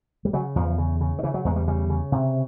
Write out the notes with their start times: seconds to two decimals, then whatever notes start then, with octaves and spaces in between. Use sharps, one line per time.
0.25 G3
0.33 C#3 F#3
0.55 E2 F3
0.78 C#3
1.01 C#3
1.19 D#3
1.23 C#3 E3
1.34 F#3
1.45 E2 G#3
1.56 G3
1.68 C#3 G3
1.90 C#3
2.12 C3